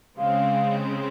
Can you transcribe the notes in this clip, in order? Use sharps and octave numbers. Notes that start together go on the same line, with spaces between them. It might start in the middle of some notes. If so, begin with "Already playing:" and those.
C#3 G#3 C4 F5